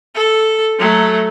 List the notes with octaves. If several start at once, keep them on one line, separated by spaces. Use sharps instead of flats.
A4
F#3 A3